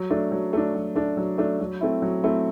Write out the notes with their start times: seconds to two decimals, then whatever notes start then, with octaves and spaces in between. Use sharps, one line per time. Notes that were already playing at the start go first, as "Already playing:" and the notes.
Already playing: F#3
0.10 A3 D4
0.32 F#3
0.53 A3 D4
0.75 F#3
0.95 A3 D4
1.17 F#3
1.38 A3 D4
1.60 F#3
1.81 A3 C4 E4
2.02 F#3
2.23 A3 C4 E4